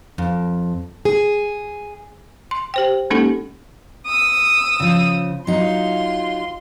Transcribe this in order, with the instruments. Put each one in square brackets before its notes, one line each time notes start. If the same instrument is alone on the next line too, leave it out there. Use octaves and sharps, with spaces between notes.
[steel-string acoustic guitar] F2
G#4
[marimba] C6
G4 C5 G5
G#3 A#3 C#4 D#4 G4 A4
[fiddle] D#6 E6
[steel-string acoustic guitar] C#3 F3
[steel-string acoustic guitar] F#3 D#4 [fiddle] F4 C6